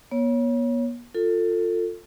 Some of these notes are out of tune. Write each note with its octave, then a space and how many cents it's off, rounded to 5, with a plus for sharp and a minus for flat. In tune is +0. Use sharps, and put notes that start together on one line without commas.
B3 -45 C#5 +0
F4 +15 A4 +25